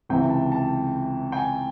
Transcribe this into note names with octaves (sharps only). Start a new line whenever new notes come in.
C#2 C3 E3 G5
A5
A5
G5
G#5